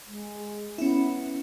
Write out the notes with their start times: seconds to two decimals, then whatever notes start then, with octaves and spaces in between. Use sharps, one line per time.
0.07 G#3
0.78 B3 C#4 E4